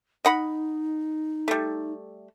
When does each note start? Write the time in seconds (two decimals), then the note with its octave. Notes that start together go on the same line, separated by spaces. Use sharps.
0.25 D#4 D#5 F#5 B5
1.48 G3 A3